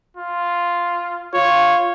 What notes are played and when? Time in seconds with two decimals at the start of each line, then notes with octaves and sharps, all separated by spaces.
0.17 F4
1.34 F4 C#5